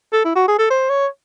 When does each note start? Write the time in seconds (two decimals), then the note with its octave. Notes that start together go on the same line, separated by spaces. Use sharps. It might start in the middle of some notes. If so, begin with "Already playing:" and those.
0.13 A4
0.25 E4
0.35 F#4
0.48 G#4
0.59 A4
0.70 C5
0.89 C#5